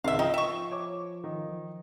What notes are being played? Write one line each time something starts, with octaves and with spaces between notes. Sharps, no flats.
C#2 G#2 C3 D#3 E5 F5
F3 D#4 F4 D#5 G5
E5 C#6
C#5 D6
D#3